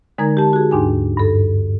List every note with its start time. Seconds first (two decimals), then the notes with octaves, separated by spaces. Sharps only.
0.18 D3 G#3 D#4 A#4 A#5 G#6
0.37 G4 A5
0.53 F#4 G#4
0.71 D#2 G#2 D4 D#4 G#5
1.17 G2 A4